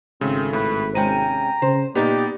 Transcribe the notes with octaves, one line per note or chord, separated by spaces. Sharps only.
G#1 C#3 A3 C4
A2 B4
C3 G#3 C#4 G5 A#5 D#7
C#3 C5
A#2 A#3 B3 D#4 G4 D5